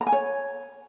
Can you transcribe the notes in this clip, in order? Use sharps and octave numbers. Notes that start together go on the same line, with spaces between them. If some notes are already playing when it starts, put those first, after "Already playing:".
A#5
G#5
C#5